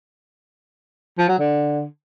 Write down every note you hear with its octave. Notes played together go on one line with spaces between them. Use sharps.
F3
F#3
D3